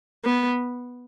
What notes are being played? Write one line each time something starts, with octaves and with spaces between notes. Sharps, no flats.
B3